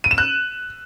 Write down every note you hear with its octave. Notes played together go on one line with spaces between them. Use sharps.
D#7
E7
F#6